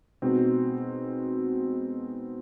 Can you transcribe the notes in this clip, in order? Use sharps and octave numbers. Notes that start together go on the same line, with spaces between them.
B2 G#3 C4 D#4 F#4